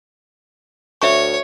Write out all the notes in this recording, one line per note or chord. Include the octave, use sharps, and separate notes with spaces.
D2 C#5 E5 C#6